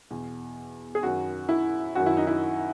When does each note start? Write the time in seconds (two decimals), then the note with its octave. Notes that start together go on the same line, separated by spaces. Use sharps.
0.10 E2 B2
0.95 G#4
1.03 F#2 D#3 F#4
1.49 E4
1.95 F#2 D#3 F#4
2.06 E4
2.16 D#4
2.27 E4